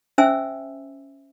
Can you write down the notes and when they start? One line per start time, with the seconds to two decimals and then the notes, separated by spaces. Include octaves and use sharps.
0.18 C#4 C5 E5 G#5 E6